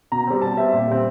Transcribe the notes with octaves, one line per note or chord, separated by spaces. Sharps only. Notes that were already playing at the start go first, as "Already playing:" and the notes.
B2 A#5
G3 C4
B2 A5
G3 C4 E5
A#2
G3 C4